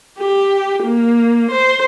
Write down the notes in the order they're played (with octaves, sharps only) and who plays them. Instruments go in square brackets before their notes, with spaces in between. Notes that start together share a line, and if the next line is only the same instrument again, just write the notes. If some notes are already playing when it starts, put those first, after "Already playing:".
[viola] G4
A#3
C5